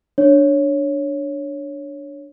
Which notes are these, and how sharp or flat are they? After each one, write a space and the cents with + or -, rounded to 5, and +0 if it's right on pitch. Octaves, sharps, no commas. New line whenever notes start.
D4 +0 C#5 +0